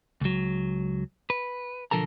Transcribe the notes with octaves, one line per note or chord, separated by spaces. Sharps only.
C#2 F#3
B4
B1 D3 F3 A4 A#4 A#5